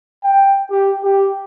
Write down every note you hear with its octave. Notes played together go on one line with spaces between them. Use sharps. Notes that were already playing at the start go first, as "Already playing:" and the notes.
G5
G4
G4